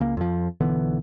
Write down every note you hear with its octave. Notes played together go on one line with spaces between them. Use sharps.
C#2 A#3
F2 F3
B1 D3 E3 B3